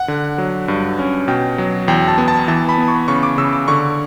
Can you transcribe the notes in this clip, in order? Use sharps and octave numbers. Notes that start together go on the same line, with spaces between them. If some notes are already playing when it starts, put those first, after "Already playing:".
Already playing: F#5
D3
F#3
G2
C#4
B2 G5
F#3
E2 G5
A5
B3
A5
E3 A5
B5
B3
C#6
C#3 C#6
D6
C#3 E6
D6
D3 C#6